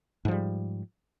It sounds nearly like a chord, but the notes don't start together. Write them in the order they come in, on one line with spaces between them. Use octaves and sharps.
G#2 F3 G3